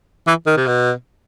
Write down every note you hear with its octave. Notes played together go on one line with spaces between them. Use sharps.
E3
D#3
C3
B2